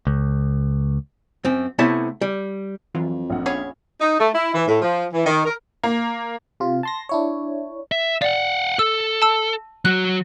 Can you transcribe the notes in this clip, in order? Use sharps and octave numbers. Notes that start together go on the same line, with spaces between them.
C#2
F#2 C4
C3 A3 B3 E4 C#5 A5
G3
F2 E3 F#3 F4
A#1 F#5
C#4 G#4 C#5 F5 B5
D#4
A3
E4
E3
A2
F3
E3
D#3
A#4
A#3
C3 F4
A5 C6 A#6
D4 E4 C#5
E5
D5 F5 F#5
A4 E6
A5 E6
F#3 F#4 F#6